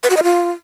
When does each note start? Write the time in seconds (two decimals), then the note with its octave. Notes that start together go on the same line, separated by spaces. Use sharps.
0.03 B4
0.10 F#4
0.17 D#5
0.23 F4